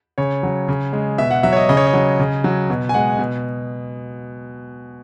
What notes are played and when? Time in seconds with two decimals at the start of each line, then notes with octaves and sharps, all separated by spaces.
0.18 C#3 C#5
0.43 F#3
0.68 C#3
0.93 G#3
1.18 B2 E5
1.31 F#5
1.43 F#3 E5
1.53 C#5
1.57 D#5
1.69 C#3 D#5
1.77 C#5
1.87 D#5
1.94 F#3
2.20 C#3
2.44 F#3
2.70 B2
2.89 G#5
2.94 G#3 F#5
3.19 B2